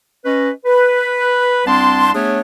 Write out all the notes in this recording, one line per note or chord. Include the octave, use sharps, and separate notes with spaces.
C#4 B4 D#5
B4
C2 C4 D4 A5 C6
A3 B3 D4 G#4 C#5